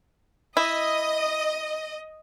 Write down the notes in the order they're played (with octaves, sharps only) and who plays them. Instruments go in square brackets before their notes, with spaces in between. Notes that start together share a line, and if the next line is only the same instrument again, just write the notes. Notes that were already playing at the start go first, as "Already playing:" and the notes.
[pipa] E4 [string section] D#5